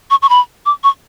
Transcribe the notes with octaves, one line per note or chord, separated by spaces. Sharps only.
C#6
C#6
B5
D6
C#6